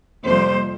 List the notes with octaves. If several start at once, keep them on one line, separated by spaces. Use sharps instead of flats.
F2 C3 G3 A#3 C5